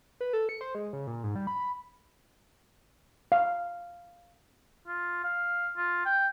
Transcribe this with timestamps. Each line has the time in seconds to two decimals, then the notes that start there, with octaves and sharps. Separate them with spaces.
0.21 B4
0.33 A4
0.49 C#7
0.61 C5
0.75 G#3
0.93 C#3
1.07 A#2
1.23 G#2
1.35 G3
1.47 B5
1.59 B5
3.32 F5
4.87 F4
5.24 F5
5.77 F4
6.06 G5